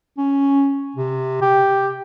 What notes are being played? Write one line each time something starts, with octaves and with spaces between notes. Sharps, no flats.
C#4
C3
G4